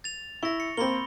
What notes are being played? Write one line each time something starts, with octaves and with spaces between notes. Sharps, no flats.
A6 F7
E4 C#6 A#6
C#7
A#3 C4 B5 C6 G7